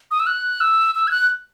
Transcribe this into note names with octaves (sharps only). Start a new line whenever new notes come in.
D#6
E6
F#6
E6
E6
G#6
F#6